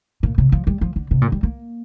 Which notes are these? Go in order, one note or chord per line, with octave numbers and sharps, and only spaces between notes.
A#2
C3
F3
G3
F3
D3
C3
A#2
G3
A#3